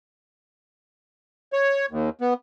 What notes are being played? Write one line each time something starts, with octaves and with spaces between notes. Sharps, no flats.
C#5
D#2
B3